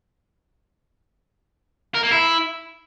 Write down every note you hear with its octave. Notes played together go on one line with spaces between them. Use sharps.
A#4
A#3
E4